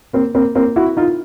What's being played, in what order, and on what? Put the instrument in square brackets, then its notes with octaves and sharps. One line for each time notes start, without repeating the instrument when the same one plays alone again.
[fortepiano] A#3 C4
A#3 C4
A#3 C4
E4 F#4
D#4 F4